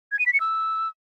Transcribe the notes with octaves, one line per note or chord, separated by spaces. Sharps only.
G#6
D#7
B6
C#7
E6